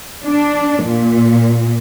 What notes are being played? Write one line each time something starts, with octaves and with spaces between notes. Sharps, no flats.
D4
A#2